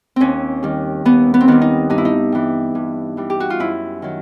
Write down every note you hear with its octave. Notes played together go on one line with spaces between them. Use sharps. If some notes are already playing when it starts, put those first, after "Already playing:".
D#2 C4 C#4
D#3 G3
D#2 B3
B3
C4
D#3 G3 B3
D#4
G2 D#4
E4
D#4
E3 G3
G2
E3 G3
G4
F#4
F4
F#2 E4
D#3 F#3